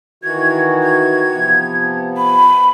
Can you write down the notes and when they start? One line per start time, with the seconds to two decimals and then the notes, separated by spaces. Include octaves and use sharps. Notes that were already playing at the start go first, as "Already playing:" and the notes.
0.23 D#3 E3 F#4 G#6
0.82 G#6
1.32 C3 F3 B3
2.17 B5